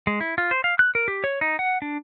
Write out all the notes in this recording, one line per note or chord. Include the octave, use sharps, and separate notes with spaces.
G#3
E4
F4
C5
F5
F#6
A#4
G4
C#5
D#4
F#5
D4